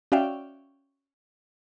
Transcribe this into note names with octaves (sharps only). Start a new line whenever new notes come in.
C#4 F#4 D5 E5 F5 G5